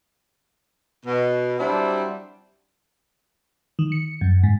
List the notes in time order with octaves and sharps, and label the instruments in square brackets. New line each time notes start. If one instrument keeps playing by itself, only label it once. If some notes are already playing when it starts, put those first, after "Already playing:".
[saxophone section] B2
F#3 G3 C4 D4 E4
[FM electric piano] D#3
C#7
F#2
G#2